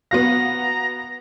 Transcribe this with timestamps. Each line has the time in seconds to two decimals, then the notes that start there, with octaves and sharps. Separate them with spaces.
0.11 B3 F#4 F5 A#5